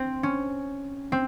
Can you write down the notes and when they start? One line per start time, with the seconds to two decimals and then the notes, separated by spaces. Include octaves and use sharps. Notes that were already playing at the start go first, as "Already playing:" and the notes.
Already playing: C4
0.23 C#4
1.12 C4